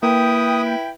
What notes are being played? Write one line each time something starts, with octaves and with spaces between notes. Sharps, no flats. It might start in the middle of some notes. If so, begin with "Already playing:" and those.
A#3 E4 B4 G5 D#6